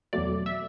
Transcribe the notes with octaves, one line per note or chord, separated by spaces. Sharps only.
E2 B2 F#3 A3 D5
E5